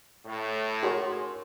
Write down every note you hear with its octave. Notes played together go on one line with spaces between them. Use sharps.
A2
F#4 G#4 A#4 C#5 C6